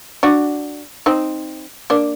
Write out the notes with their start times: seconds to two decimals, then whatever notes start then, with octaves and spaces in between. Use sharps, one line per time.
0.23 D4 F#4
1.06 C4 D#4
1.90 A#3 D4